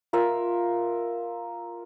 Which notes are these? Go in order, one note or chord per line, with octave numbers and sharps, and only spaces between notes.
F4 A#4 E5